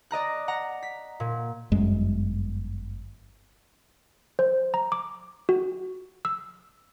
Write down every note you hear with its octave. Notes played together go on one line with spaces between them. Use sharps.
D5 D#5 A#5 F#6
F#5 A#5
B6
A#2
G1 F#2 G#3
C5
A#5
D6
F#4
E6